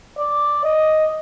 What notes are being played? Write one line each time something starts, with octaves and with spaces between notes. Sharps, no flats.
D5
D#5